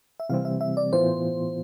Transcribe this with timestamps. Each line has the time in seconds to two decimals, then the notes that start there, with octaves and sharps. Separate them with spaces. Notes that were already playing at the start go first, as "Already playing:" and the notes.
0.20 E5
0.29 C3 E3 G3 C4 F5
0.45 E5
0.61 E5
0.77 D5
0.93 A2 E3 B3 F4 C5